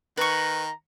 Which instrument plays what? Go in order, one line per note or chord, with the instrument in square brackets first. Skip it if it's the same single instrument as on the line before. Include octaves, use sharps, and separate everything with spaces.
[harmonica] D#3 [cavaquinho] B4 C#6 [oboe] A#5